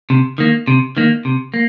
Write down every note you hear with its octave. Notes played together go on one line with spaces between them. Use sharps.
C3
D#3 A#3
C3
D#3 A#3
C3
A#3